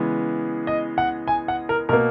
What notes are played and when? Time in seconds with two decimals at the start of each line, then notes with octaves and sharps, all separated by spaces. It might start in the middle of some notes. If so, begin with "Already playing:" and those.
Already playing: C#3 E3 G#3 B3
0.67 D#5
0.98 F#5
1.28 G#5
1.48 F#5
1.69 A#4
1.89 B2 A#3 A#4